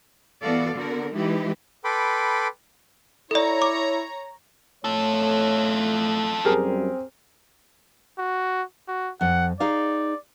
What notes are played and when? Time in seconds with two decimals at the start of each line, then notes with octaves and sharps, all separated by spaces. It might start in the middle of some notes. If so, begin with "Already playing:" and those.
0.42 E3 B3 F#4 A4 D5 F5
0.75 D3 B3 F#4 A#4
1.14 E3 G#3 D#4 E4 G4 B4
1.84 A4 B4 G5 B5 C6 D6
3.31 E4 A4 C#5 D5 A#5
3.62 D6
4.85 A2 A3 F4 A4 C#5
6.45 F#2 G3 C4 G4 G#4 A#4
8.18 F#4
8.88 F#4
9.21 F2 F#5
9.60 D#4 G#4 D5 F5